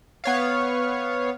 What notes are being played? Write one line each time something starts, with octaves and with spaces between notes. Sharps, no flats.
B3 C#5 F5